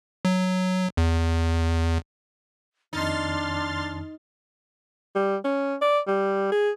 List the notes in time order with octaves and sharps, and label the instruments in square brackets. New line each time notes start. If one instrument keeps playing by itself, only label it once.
[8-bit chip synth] F#3
E2
[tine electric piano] F2 D#3 [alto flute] D4 [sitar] D#4 [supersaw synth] C6 F6 A6
[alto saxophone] G3
C#4
D5
G3
G#4